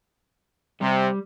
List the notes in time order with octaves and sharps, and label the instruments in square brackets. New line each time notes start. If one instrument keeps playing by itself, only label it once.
[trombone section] C3 [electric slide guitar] G3